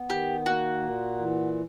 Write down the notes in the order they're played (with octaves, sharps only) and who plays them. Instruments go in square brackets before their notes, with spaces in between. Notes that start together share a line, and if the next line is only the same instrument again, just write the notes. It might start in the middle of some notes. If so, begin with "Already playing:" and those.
Already playing: [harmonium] B3
[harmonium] D#3 [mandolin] G4
[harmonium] A#3 [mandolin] F#4
[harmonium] A#2
E3